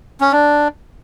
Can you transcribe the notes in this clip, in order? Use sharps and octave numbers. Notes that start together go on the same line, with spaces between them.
C#4
D4